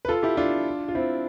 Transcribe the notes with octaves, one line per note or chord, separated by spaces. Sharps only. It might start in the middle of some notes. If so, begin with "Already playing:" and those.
B4
F4 A4
E4 G4
D4 F4
F4
C4 E4